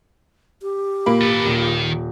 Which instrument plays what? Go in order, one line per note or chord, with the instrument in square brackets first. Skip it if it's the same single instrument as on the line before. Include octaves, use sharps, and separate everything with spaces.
[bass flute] G4
[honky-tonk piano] A#2 A#3 B5
[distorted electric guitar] A4 B4
[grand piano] D#1 [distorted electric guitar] D#3